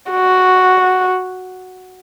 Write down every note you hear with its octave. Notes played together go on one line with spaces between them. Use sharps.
F#4